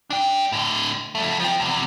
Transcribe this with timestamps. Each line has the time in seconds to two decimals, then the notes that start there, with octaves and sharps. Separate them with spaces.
0.10 D4 G5
0.52 A2 D3
1.15 F2 A3
1.40 F3 C4
1.60 E2 C3